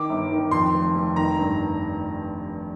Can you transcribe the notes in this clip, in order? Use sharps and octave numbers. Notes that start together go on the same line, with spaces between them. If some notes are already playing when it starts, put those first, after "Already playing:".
Already playing: D#3 D6
G1
D#3
F2 C6
F1
F1
D#3 A#5
G2